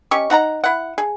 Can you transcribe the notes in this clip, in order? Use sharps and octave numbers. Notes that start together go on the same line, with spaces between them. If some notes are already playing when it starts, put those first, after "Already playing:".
C#4 G4 D#5 C#6
D#4 F#5 A5 A#5
E4 F#5
G#4